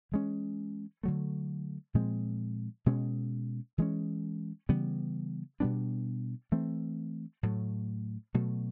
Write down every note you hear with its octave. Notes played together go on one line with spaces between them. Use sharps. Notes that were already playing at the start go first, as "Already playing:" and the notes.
E3 G#3 C#4
D3 F#3 A3
A#2 F3 G#3 C4
B2 G#3 C#4
E3 G#3 C#4
C#3 E3 G3 B3
B2 G3 B3 D4
E3 A3 C4
A2 F#3 A3
B2 F#3 A3